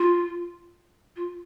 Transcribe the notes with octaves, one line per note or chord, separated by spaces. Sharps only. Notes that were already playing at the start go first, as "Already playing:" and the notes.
Already playing: F4
F4